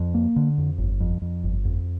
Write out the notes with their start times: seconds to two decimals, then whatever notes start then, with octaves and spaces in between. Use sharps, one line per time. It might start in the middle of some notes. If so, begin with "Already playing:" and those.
Already playing: F2
0.14 A#3
0.36 D3
0.58 F2
0.78 G1
1.00 F2
1.22 F2
1.44 G1
1.65 F2